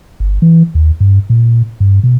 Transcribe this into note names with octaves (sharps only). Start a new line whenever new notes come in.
G1
E3
D#2
G2
A#2
G2
B2